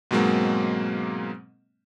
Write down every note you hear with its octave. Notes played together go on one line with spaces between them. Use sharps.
G#2 B2 F#3 G#3 A#3 C4